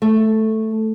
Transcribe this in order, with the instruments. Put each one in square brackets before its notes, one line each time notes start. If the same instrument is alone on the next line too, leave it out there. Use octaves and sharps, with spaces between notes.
[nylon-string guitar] A3